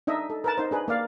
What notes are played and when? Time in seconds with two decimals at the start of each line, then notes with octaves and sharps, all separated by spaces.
0.07 D4 D#4 D#5 E5
0.30 A4
0.44 A#4 B4 A5
0.58 D#4 C5
0.71 D4 G#4 B4
0.88 A#3 D5 F5